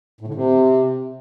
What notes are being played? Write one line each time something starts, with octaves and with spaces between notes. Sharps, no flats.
A2
D3
C3